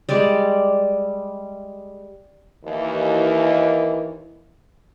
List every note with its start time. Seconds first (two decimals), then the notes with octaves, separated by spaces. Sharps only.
0.09 G3 G#3 D5
2.64 D#2 E3